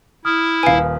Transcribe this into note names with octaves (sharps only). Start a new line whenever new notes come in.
E4 D#6 F6
D#1 B4 F5 G#5